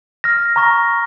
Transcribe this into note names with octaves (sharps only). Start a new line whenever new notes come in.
F6 A#6
A#5 C#6 A#6